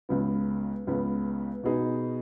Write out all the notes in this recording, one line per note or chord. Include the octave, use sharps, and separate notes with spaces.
C#2 C#3 B3
C#2 C#3 B3
B2 B3 D#4 G#4